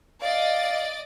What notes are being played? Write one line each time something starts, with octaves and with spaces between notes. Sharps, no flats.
D5 D#5 F5 A6